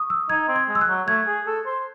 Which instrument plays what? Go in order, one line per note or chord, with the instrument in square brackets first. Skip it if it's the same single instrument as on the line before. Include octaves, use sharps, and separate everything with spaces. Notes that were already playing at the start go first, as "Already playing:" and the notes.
Already playing: [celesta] C#6 D#6
E6
[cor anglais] D#4 [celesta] G#6
[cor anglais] C4
[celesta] G#6
[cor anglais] G#3
[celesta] E6
F#6
[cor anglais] F#3
[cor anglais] A3 [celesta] G#6
[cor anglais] G#4
A4
C5